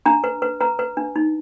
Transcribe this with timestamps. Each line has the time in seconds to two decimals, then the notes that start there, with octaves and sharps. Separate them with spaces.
0.06 D4 A#5
0.24 B4
0.42 B4
0.61 B4 A#5
0.79 B4
0.97 D4
1.16 D#4